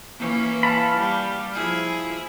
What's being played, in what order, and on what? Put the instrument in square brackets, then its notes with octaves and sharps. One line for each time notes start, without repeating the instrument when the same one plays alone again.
[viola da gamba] E3 A#3 C#4
[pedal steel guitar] F5 A5 B5
[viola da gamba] G3
F3 E4 G#4